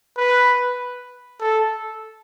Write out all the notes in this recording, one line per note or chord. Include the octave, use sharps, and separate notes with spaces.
B4
A4